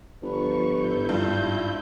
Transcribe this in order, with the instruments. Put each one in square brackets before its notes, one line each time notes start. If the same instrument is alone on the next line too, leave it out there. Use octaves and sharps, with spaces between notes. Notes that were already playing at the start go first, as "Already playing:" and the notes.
[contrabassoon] G1 [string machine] F3 C#6 [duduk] B4
[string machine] G#2 E4 G6
[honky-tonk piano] G2 [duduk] F4